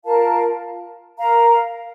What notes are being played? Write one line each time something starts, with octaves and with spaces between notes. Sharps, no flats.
F4 A#4 F5 A5
A#4 F5 A#5